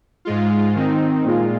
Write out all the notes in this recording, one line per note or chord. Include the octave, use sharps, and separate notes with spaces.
G#2 G#3 F4
D#3 C4 D#4
A#2 G#3 F4